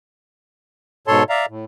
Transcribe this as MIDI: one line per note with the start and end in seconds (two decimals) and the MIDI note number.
1.07 1.23 44
1.07 1.23 47
1.07 1.23 69
1.07 1.23 73
1.07 1.23 81
1.07 1.23 84
1.30 1.46 74
1.30 1.46 76
1.30 1.46 77
1.30 1.46 82
1.49 1.65 45